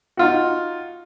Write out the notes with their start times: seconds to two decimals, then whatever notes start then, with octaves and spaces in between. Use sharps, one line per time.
0.17 D#4 F4 F#4